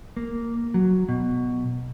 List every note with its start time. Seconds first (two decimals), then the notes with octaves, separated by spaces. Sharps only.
0.17 A#3
0.74 F#3
1.09 B2